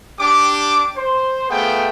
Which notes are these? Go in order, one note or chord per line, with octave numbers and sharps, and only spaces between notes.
D4 G4 D6
C5
A3 B3 F4 G#4 G5